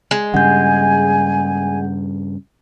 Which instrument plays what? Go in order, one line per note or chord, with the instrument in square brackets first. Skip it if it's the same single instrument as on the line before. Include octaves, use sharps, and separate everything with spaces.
[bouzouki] G#3
[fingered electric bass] G2 C#3 G3 [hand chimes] F#5 G6 [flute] G#5